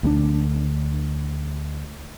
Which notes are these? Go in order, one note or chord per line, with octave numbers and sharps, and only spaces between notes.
D2 G#3 D4